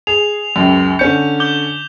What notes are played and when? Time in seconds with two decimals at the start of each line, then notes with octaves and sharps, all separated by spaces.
0.07 G#4 F7
0.56 C#2 F#2
0.99 D3 C#4 G6 C#7
1.40 D6 G6 G7